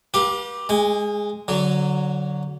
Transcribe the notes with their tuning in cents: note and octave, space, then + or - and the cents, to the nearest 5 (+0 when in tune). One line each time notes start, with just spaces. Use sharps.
G4 +0 B4 -40 F5 +40
G#3 +0 G#5 -40
D3 -25 F#3 +0